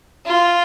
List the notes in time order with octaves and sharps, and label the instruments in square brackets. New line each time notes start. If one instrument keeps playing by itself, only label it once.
[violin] F4